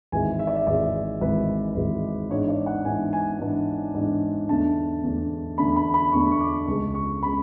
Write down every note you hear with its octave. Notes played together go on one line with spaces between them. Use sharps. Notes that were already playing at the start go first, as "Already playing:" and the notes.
G#1 G#2 E3 G#3 G#5
E5
D5
E5
G#1 G#2 E3 G#3 D5
G#1 G#2 E3 G#3 B4
G#1 G#2 E3 G#3
G#2 E3 B3 D4 C#5
D5
F#5
G#2 E3 B3 D4 G#5
G#5
G#2 E3 B3 D4
G#2 E3 B3 D4
E2 D3 A3 D4 A5
E2 D3 A3 D4
E2 D3 A3 D4 B5
B5
B5
E2 D3 A3 D4 C#6
C#6
D6
C#2 C#3 G#3 C#6
C#6
C#3 G#3 B5